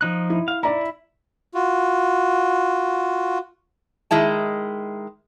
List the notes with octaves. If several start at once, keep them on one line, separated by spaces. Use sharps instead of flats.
F3 D#4 F#6
E4
F5
E4 D5 A#5
F4 F#4
D#3 G#3 E4 A5